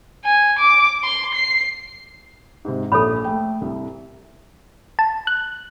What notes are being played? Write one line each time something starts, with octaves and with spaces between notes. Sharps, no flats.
G#5
D6
C6
C7
G#2 C3
A#1 A4 C#5 B5 D#6
A3 G5
C2
A5
F#6